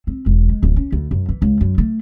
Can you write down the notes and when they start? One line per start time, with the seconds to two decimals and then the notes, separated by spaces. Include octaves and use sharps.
0.07 C4
0.26 E1
0.49 G#3
0.63 D1
0.76 C#4
0.92 D2
1.11 F#2
1.29 E3
1.42 C#2
1.61 F#2
1.78 A3